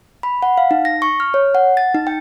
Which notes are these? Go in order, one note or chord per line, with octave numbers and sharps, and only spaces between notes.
B5
F#5
F5
D#4
A#6
C#6
F6
C#5
F#5
A6
D#4
G5